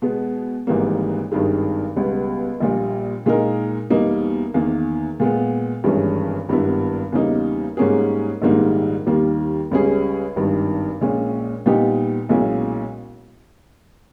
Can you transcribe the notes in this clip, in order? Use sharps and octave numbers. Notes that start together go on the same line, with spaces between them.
B2 G#3 B3
G#1 G#2 E3 G3 A#3
G#1 G2 D#3 G#3
C#2 B2 G3 B3
A#1 A#2 G3
A#2 G#3 D#4 A#4
E2 B2 G3 A#3 D#4
E2 D#3 A#3
A#2 G#3 B3
G#1 G2 E3 G#3 C#4
G#1 G2 G3 B3 E4
E2 C#3 G3 A#3 D#4
G#2 G3 A#3 C#4 G#4
A#1 G#2 D#3 G3 A#3
D#2 D#3 G3 A#3
C#2 C#3 G3 C#4 G#4
G#1 G2 D#3
A#1 A#2 G#3 C#4
A#2 G3 B3 D#4 G4
B1 A#2 G#3 C#4 E4